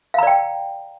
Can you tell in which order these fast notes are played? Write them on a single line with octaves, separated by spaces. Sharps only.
F5 A#5 D5 G5